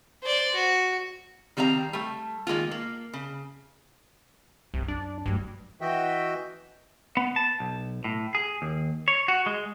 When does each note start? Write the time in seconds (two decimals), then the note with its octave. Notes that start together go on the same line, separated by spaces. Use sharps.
0.23 C5 D5
0.54 F#4
1.57 D#3 G3 C4 F5 A#5
1.93 G3 A3
2.47 D#3 G#3 A#3 F4
2.71 A#3
3.13 C#3
4.74 C2 F#2
4.88 D4
5.26 D2 G2 F#3
5.81 E3 F#4 D#5 E5 G5
7.17 B3
7.36 A5
7.60 B1
8.04 A2
8.35 G#4
8.62 D#2
9.08 C#5
9.28 F#4
9.46 G#3